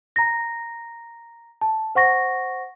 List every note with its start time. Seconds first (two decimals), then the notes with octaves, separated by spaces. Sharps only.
0.16 A#5 A#6
1.61 A5
1.95 C5 F#5 C#6 A#6